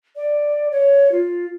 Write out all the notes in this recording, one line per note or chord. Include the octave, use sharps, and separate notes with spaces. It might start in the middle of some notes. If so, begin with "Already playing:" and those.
D5
C#5
F4